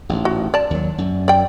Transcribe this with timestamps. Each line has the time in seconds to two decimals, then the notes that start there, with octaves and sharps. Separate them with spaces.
0.09 A1 G#2
0.25 F#4
0.54 D5 A5
0.70 D#2 F#3
0.98 F#2
1.28 D5 G5